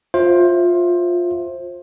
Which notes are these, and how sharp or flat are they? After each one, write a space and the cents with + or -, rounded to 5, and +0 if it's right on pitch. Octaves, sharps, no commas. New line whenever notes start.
F4 +15 C5 +20 E5 +0